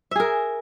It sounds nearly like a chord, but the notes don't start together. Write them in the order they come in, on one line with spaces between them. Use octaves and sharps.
E5 G#4 A#4